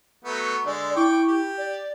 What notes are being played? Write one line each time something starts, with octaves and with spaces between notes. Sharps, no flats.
F#3 A3 B3
C#6
D3 G#3 D5
E4 G5 C#6 D6
G4
D5